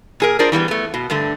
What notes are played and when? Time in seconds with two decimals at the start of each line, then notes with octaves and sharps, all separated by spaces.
0.20 A#2 G#4 A#4
0.39 D4 F4 G#4 A#4 C5 D5
0.52 E3 G3 A#3 B3
0.68 A3 B3
0.94 B2
1.10 G2 D3 A3